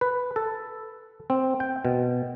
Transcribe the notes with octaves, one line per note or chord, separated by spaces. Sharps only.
B4
A4
C4
G5
B2